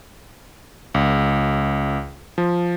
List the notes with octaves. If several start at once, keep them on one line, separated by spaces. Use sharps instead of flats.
C#2
F3